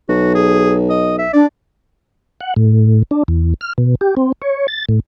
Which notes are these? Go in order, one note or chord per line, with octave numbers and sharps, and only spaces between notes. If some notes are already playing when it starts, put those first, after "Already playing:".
B1 F#4
G#4
D#5
E5
D4 D5
F#5
A2
D4
E2
F6
B2
G4
C4
C#5
A6
A2